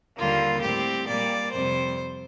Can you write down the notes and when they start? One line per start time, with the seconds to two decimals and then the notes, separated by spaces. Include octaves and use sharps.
0.18 D#2 D3 G3 A#3 F4
0.63 A2 G3 C4 G4
1.07 A#2 G3 A#3 D5
1.53 F2 C3 G3 C5